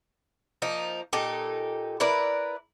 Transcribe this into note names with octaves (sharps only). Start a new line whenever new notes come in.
F3 A#3 D#4
A#2 D#4 G4 A4
E4 A#4 B4 D5